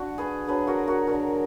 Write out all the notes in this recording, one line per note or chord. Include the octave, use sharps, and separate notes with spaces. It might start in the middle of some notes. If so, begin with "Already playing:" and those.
Already playing: D3 F#4
G#4 B4
D3 F#3 G#4 B4
F#4 A#4
F#4 A#4
D3 F#3 F#4 A#4